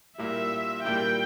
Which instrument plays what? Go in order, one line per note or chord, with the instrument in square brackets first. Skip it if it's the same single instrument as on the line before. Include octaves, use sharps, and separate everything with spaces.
[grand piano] A#2 G3 A#3 E4 [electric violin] E5
[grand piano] A#2 G3 A#3 E4 [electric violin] G5